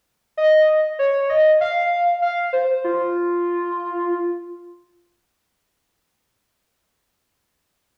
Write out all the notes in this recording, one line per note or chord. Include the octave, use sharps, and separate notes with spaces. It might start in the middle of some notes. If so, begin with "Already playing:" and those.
D#5
C#5
D#5
F5
F5
C5
F4